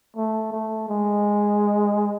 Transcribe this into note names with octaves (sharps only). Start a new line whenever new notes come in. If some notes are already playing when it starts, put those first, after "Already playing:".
A3
A3
G#3